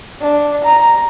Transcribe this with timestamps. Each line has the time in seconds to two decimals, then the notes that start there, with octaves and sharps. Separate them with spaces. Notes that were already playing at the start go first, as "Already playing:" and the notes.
0.22 D4
0.65 A#5